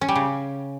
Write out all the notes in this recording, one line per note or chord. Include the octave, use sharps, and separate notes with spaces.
C#4
G3
C#3